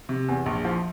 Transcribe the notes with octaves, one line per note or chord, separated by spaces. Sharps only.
C3
E2
A#1
F3